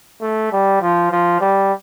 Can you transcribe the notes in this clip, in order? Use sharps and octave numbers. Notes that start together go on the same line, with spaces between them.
A3
G3
F3
F3
G3